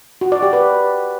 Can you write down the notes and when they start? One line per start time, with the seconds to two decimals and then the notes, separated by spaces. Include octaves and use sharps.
0.21 F#4
0.32 D5
0.42 G4
0.53 B4